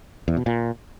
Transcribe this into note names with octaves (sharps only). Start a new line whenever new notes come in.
E2
B2
A#2